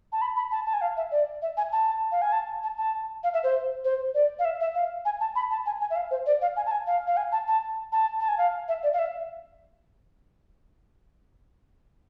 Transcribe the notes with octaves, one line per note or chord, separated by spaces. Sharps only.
A5
B5
B5
A5
A5
G#5
F5
E5
D5
E5
G#5
A5
F5
G#5
A5
A5
A5
F5
E5
C5
C5
D5
F5
E5
E5
F5
G#5
A5
B5
A5
G#5
G#5
E5
F5
C5
D5
F5
G#5
A5
G#5
F5
F5
G#5
A5
A5
A5
A5
G#5
F5
E5
D5
F5
E5